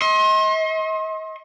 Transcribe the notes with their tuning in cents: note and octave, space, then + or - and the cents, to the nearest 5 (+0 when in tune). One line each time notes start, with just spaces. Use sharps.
D#5 +35 C6 +35